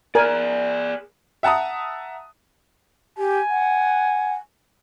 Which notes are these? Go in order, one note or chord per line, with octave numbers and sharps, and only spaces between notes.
G#4 A#4 D5 G#5
E5 F#5 A5 A#5 D#6
G4 G#5
F#5